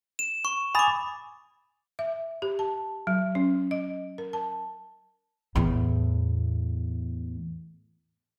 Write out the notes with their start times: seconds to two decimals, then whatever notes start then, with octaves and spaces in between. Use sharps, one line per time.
0.19 E7
0.45 C#6
0.75 G#5 B5 D6 D#6 A6
1.99 E5
2.42 G4
2.59 A5
3.07 F#3
3.35 C#4
3.71 D#5
4.18 A#4
4.33 A5
5.55 E2 A2